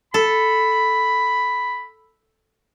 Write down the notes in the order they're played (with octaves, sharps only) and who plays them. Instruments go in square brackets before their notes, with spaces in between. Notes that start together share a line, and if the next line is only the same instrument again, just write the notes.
[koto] A4 [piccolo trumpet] B5